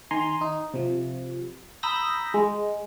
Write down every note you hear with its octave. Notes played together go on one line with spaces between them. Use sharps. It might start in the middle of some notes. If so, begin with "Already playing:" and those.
D#3 G#5 A#5 C6
D#4
C3 F3
A#5 B5 D#6 E6 G6 A#6
G#3